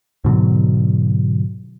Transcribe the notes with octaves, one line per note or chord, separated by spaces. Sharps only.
G#2 B2 D3 F#3